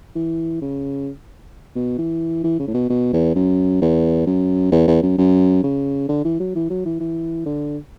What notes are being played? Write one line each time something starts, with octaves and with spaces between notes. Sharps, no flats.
E3
C#3
B2
E3
E3
C#3
A2
B2
B2
E2
F#2
E2
F#2
E2
E2
F#2
F#2
C#3
D3
E3
F#3
E3
F#3
E3
E3
D3